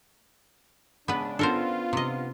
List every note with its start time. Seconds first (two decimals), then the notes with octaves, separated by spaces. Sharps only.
1.08 C#3 G#3 B3 D4 B4
1.39 B3 C#4 D4 F4 A4 A#4 C5
1.93 C3 D#5